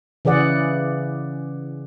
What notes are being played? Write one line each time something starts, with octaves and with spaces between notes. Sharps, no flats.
C#3 E3 G#4 D5 F#5